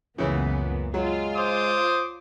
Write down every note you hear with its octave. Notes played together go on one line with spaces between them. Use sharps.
C#2 F#2 A#2 C#3 E3 B3
F#3 G#3 F4
C5 D6 D#6